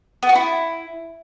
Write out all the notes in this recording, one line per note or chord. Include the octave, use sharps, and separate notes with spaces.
B3
F#4
E4